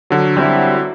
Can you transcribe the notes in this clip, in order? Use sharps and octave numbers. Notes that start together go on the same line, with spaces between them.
D3 F#3
G3 C4 E4